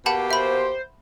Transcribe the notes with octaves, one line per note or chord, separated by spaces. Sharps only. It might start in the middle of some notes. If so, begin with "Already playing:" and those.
B2 A#3 G4 F#5 A5 B5
C5 E5 B5